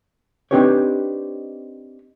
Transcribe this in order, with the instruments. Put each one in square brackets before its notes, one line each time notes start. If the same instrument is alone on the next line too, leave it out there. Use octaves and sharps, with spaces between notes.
[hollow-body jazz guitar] C4 D4 D#4 G4 B4 C#5